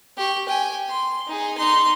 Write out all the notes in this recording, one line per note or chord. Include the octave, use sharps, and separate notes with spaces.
G4 C#6
G5 G#5
C6
D#4 G#4
D#4 C6